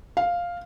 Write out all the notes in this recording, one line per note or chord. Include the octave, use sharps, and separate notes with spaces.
F5